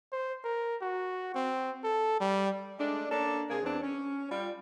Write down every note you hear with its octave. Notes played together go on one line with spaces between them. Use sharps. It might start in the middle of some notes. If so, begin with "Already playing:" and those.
C5
A#4
F#4
C4
A4
G3
G#3 A3 D4
A#3 C#4 D4 A4
C3 A#3 G#4
E2 E3 C4 D4
C#4
G3 F4